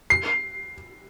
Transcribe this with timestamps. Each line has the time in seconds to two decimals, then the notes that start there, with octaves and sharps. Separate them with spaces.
0.10 C7